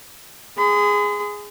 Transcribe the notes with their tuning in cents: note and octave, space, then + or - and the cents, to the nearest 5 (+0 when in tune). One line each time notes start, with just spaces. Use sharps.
G#4 -5 C6 -45